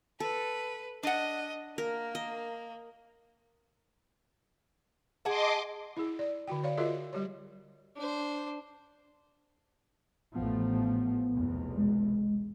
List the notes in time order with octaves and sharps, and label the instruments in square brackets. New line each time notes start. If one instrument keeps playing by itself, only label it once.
[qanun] A4 [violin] B4
[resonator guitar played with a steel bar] D4 F#5 [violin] D#5
[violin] A#3 [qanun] A#4
[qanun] D#5
[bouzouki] G#4 F#5 A5 [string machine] D#5 C6 D6
[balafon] E4 G#4
D5
D3 F#4 G5
C#5 D5 F5
F4 F#4 G#4 A#4 D#5 E5
G3 G4 C#5
[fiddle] D4 C5
[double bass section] A1 F3 A3 [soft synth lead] B3
[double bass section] F1 B1 E2
[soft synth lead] G#3